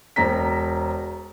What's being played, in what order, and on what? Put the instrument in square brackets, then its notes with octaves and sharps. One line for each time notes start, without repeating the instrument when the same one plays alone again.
[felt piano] E1 C5 A#5 B6